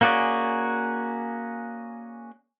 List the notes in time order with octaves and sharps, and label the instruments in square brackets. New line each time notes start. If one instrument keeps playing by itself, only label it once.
[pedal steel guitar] A#3 C#4 F#4 G#4 D5